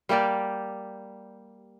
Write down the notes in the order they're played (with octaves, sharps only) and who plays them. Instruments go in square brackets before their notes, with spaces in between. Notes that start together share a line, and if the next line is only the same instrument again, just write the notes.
[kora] G3 A#3 G4 D5